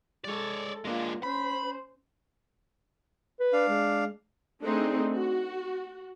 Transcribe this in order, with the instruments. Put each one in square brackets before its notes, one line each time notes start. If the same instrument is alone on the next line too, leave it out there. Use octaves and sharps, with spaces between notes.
[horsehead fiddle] G#3 A4 [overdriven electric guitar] C#5 D5
[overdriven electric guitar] G#3 D4 [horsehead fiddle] A#3 F4
[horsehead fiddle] C#4 C5 [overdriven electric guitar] B5
[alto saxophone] B4
[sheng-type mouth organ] D4 F5
[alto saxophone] G#3
[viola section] A3 C4 D4 D#4 G#4
F#4